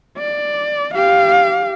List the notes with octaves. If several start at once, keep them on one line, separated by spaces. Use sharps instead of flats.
D5
G4 F5